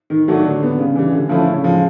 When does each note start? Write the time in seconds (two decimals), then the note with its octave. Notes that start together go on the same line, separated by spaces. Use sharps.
0.10 D#3
0.28 F#3 A3 D4 F#4
0.44 D3
0.61 G3 B3
0.79 C#3
0.95 E3 G3
1.12 D3
1.29 F3 A3 C#4 E4
1.47 C#3
1.64 F3 G#3